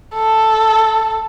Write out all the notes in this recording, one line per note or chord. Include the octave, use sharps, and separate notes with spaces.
A4